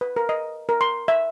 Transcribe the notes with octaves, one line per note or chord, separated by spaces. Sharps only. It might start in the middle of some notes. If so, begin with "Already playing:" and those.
B4
A#4
D#5
A#4
C6
E5